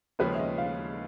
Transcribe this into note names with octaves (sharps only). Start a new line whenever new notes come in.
D#2 C#3 F3 G#3 C#4 B4
E5
D#5
F5